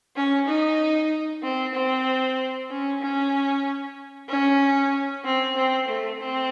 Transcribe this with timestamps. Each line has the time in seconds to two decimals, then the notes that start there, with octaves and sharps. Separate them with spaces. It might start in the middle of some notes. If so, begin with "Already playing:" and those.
0.16 C#4
0.48 D#4
1.43 C4
1.74 C4
2.71 C#4
3.02 C#4
4.29 C#4
5.25 C4
5.57 C4
5.89 A3
6.20 C4